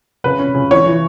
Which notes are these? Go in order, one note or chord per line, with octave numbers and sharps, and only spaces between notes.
C#3 B4
C#4
C#3
E3 C#5
E3